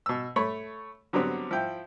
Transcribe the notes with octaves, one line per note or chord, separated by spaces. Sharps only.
B2 E6
A3 C#5 B5
D3 F#3 G3 B3 C4
F3 E4 G5